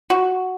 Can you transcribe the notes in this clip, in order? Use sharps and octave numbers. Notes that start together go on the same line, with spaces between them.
F#4